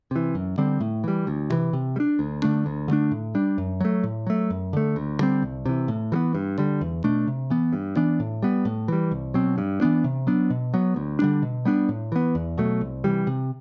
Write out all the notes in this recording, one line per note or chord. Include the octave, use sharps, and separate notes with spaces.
C3 E3
F#2
D3 G3 C4
A2
E3 G3
D2
C3 E3
C3
G3
D4
D2
D3 A3 D4
D2
D3 A3 D4
A2
G3 D4
F#2
F#3 A3
A2
F#3 A3
F#2
D3 A3
D2
D3 G3 C4
C2
C3 E3
A2
E3 G3 B3
G2
D3 G3
E2
B2 A3 D4
C3
E3 B3
G2
E3 B3 D4
A2
G3 B3
A2
E3 G3
C2
B2 F#3 C4
G2
E3 B3 D4
C3
F#3 B3 D4
B2
F#3 B3
D2
D3 G3 D4
B2
G3 B3 D4
A2
E3 B3
E2
B2 F#3 A3
C2
C3 E3 G3
C3